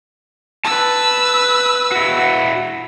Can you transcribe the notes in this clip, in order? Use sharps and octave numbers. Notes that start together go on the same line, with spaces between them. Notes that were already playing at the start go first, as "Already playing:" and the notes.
B4 A5 E6
E4 F#4